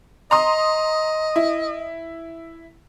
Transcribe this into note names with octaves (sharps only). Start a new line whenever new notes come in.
D#5 A#5 C6 D#6
E4